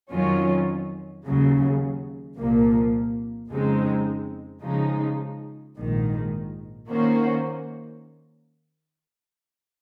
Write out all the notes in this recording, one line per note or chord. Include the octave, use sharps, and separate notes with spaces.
F2 D#3 F#3 C#4 F4
D#2 C#3 F#3
C2 A#2 F3 A#3
F2 C#3 G#3 C4 D#4
C#3 F3 G#3 D#4
A#1 G#2 D#3
D#3 A#3 C#4 F#4 C5